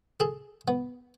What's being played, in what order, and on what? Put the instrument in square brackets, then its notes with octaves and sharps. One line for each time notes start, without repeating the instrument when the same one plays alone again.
[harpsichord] G#4 A4
B3